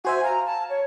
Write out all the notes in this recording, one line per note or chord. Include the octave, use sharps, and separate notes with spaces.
F#4 C5 E5 G#5
F5 A#5
A5
C#5